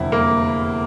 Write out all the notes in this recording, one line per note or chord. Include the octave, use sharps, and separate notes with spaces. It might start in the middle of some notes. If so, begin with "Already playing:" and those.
Already playing: F1 E2 D3 G3 E4
A#3